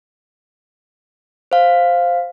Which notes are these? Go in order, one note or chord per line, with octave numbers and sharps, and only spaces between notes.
C5 F5